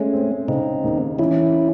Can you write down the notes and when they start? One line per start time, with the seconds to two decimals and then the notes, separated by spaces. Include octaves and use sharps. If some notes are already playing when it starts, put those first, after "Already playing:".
Already playing: G#3 A3 C#4
0.13 C4
0.48 C#3 C4 D#4
0.84 D#2
1.19 E3 C#4 E4